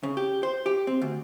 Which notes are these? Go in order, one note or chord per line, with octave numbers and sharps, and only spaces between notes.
C#3
G4
C5
G4
C4
D2